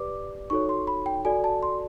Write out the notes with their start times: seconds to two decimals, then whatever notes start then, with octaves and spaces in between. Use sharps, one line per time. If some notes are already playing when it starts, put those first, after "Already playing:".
Already playing: G4 B4 D5 D6
0.50 D#4 F#4 A4 C#5 C#6
0.69 C6
0.87 B5
1.06 G5
1.25 F#4 A4 D5 G#5
1.44 A5
1.63 C6